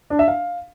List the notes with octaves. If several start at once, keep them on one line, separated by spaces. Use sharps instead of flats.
D4
E5
F5